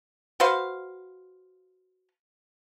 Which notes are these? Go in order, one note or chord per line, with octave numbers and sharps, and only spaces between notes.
F#4 B4 C5 F5